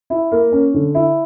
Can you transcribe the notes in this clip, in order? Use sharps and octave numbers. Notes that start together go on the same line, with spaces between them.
E4
A#3
C#4
D3
E4